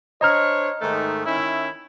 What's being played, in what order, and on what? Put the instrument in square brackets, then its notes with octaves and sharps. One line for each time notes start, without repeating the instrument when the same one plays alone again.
[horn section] D4 C5 C#5 [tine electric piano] D#5 A#5 F6
[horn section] G#2 D#3 A3
D#3 C#4 E4